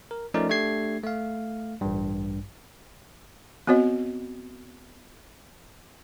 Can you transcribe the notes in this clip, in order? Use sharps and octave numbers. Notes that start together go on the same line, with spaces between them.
A#4
F3 A3 C#4 D#4 A#4 D5
A3 D4 G4 G#6 C7
A3 F5
A1 G2
B3 C4 F#4 C#5 D#5